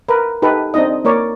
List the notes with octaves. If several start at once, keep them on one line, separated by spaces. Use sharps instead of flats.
A#4 B4
D#4 G4 A4 B4
C4 D4 D#4 D#5
A#3 A#4 C#5 D5